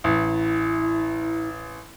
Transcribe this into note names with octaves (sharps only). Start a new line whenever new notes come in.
A1 E4